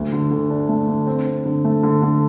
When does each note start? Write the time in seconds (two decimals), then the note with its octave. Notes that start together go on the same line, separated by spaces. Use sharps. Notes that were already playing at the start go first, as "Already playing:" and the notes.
Already playing: D2
0.12 D3
0.31 D3
0.50 D4
0.69 A3
0.88 D3
1.07 C4
1.26 C4
1.46 D3
1.65 A3
1.83 D3
2.02 D3